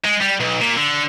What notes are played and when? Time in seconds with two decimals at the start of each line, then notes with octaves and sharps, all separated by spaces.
0.05 G#3
0.21 G3
0.41 B1
0.61 A#2
0.77 D3